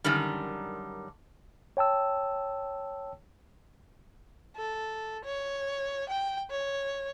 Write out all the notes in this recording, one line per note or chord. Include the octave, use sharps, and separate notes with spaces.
F#2 D3 D#3 G3
C#5 G5 A5 E6
A4
C#5
G5
C#5